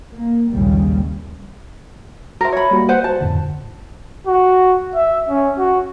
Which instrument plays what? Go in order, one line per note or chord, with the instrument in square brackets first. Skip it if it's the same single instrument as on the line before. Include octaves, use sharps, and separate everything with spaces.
[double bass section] A#3
A#1 D#2 G#2 C#3 G3
[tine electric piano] F#4 E5 [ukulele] A#4 C5
[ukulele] C#5 B5
[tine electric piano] G3 A#3 F#4
[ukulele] B4 C5 F#5
[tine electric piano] F#4 C5 [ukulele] A5
[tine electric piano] F2 A2 D3
[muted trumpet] F#4
E5
C#4
F#4